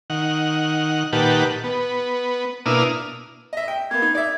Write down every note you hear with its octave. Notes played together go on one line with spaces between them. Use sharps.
D#3 F#5
A#2 D#3 G4 B4 F#5 A5
B3
B2 A#3 D4 E4 D#6 F6
D#5 E5
G5
A#3 B3 G#6
D#4
D5 E5